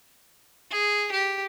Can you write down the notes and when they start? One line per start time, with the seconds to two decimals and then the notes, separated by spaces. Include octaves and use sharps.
0.71 G#4
1.12 G4